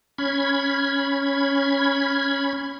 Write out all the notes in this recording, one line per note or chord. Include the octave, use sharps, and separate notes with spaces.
C#4 B5 G#6